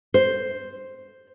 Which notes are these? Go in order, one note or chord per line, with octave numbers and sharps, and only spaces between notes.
C5